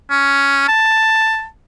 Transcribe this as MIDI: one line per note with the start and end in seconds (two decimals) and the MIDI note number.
0.10 0.65 61
0.68 1.46 81